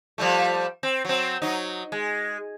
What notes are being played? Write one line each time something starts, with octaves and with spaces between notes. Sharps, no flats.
F3 G3 A3
C4
F#3 C4
F#3 D#4
G#3